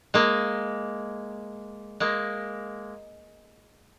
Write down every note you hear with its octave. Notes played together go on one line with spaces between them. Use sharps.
G#3 A#3
G#3 A#3